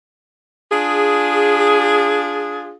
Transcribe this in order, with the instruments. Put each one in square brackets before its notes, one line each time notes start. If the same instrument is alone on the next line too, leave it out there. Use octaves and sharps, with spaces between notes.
[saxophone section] D4 F4 G#4